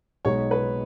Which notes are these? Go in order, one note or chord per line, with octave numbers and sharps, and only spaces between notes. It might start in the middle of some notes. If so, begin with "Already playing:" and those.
B1 B2 G#3 D#4 C#5
B4